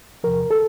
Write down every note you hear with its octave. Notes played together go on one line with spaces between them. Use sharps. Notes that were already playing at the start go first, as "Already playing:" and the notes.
E2 C3 F3 A#4
A4